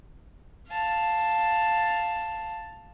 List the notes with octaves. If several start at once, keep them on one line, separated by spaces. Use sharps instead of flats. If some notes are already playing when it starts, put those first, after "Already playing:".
F5 A5